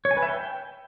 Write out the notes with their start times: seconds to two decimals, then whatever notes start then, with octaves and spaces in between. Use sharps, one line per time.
0.05 C#5
0.11 G#5
0.17 B4
0.23 E5
0.28 G5